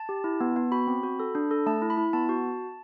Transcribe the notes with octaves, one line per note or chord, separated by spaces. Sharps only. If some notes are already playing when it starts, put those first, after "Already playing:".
Already playing: A5
G4
E4
B3
B3
F#4 B5
C4
F#4
A4
D4
A4
A3 A5
E4
B5
E4
B3 A5
F#4